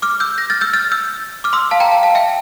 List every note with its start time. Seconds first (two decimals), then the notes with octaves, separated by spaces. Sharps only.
0.02 D6 F6
0.20 E6 G6
0.38 G6 A#6
0.50 F6 A6
0.61 E6 G6
0.73 F6 A6
0.91 E6 G6
1.44 D6 F6
1.53 C6 E6
1.71 F5 A5
1.80 G5 A#5
1.91 F5 A5
2.03 F5 A5
2.15 E5 G5